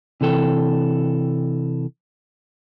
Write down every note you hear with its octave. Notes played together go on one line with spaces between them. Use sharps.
C3 E3 A4 G5